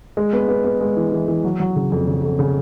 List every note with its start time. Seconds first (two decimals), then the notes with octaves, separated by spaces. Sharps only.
0.17 G#3
0.33 B3
0.49 B3
0.64 B3
0.81 G#3
0.97 E3
1.12 E3
1.28 E3
1.44 F#3
1.60 F#3
1.76 C#3
1.92 F2
2.07 C#3
2.23 F2
2.39 C#3